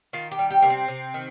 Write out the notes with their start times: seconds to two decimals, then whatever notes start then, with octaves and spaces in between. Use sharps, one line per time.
0.13 D#3 F4
0.31 G4
0.39 G3
0.51 G4
0.62 C3 A#3
0.70 C4
0.88 C3
1.14 D#3